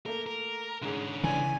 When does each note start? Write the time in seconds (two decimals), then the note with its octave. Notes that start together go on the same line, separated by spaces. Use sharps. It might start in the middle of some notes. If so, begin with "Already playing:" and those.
0.06 A3 A#3 A#4
0.27 A#4
0.82 G#2 D3 C#4 G#4
1.24 A#1 C#3 E3 G#5